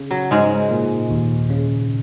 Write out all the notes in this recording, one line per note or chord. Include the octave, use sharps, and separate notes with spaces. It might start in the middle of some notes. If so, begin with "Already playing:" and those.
Already playing: C#3 C#4
F#3
G#2 G#3 D#4
A#2
D#2
C#3